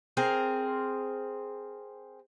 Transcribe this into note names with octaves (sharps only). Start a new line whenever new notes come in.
C4 G#4 A#4